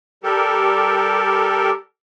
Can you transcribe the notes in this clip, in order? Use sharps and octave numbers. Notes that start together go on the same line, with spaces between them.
G3 G4 A4 A#4